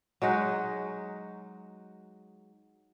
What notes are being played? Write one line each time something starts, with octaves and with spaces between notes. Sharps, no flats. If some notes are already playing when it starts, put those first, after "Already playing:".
F#3 G#3 D#4 F#4